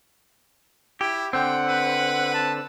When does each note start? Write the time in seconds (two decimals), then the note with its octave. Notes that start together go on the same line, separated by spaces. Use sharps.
1.01 E4 G4
1.33 D3 C4 F#5 G5
1.68 B4
2.34 A5